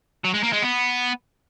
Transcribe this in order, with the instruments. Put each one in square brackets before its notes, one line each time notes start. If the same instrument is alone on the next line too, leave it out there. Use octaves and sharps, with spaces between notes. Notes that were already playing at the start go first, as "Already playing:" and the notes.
[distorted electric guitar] F#3
G#3
A#3
G#3
B3